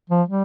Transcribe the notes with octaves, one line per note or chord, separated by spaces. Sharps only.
F3
G3